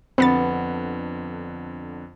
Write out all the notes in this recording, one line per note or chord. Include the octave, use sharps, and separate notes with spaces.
F2 D3 B3 C4 B4 A6